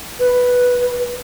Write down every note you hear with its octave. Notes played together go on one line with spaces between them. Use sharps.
B4